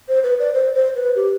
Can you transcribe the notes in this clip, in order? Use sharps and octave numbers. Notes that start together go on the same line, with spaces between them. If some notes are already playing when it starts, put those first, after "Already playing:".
C5
B4
D5
C5
C5
B4
G4